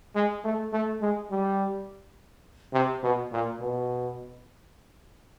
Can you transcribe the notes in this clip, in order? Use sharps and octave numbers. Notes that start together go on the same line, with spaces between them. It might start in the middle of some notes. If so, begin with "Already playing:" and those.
G#3
A3
A3
G#3
G3
C3
B2
A#2
B2